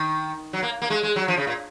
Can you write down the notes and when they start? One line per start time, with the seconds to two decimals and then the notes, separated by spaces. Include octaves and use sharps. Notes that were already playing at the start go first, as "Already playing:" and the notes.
Already playing: D#3
0.53 F#3
0.63 A#3
0.82 A#3
0.90 G#3
1.03 G#3
1.16 F#3
1.28 F3
1.37 C#3
1.47 A#2